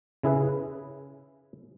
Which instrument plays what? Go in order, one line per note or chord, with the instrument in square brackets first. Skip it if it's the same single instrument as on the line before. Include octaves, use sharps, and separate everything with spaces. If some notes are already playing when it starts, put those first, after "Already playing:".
[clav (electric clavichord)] C#3 E4 G#4 B4